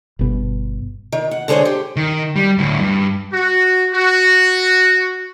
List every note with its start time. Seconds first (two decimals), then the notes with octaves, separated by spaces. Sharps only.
0.19 G1 B2
1.12 D#3
1.31 F#5
1.48 D3 G#3 G#4 C5 C#5
1.65 G4
1.96 D#3
2.36 G3
2.58 D2 A2
2.80 G2
3.33 F#4
3.94 F#4